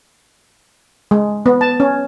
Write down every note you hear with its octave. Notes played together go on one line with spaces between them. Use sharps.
G#3
B3
A5
C#4